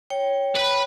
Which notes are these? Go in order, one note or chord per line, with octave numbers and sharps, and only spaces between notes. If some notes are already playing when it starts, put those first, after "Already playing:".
C#5 G5
B4 B5